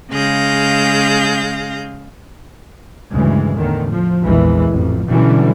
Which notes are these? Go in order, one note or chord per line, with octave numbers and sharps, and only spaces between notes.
C#3 G#3 G#4 F5 G6 A#6
D2 G2 C#3 E3 G#3
E2 A2 D3 D#3
F3
A#1 E2 A#2 E3 G#3
A1 F2
B2 D3 E3 F#3 G3 C#4